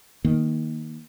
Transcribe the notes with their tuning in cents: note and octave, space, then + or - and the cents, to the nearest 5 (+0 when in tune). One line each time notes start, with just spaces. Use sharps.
D#3 +0 A#3 +0